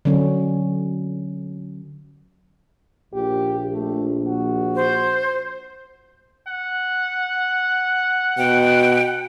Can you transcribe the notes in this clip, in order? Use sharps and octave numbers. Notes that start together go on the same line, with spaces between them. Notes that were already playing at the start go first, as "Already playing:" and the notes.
D3 F#3 C#4
A#1 G4
A3
F#4
C5
F#5
B2 G5